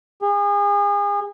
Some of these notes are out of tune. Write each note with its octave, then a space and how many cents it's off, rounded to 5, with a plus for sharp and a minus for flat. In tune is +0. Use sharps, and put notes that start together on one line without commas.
G#4 -35